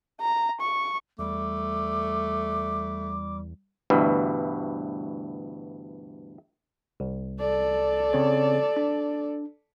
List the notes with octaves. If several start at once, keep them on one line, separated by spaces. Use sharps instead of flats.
A#5
C#6
E2 G3 A3 D6
D2 G2 B2 E3
C2
A4 D5
C#3 C4 C#5
D4